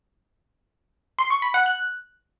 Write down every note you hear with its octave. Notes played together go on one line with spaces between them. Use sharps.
C6
C#6
B5
F#5
F#6